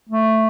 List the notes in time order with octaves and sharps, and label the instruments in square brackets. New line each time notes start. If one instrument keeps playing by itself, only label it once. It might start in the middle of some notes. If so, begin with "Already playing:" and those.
[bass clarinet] A3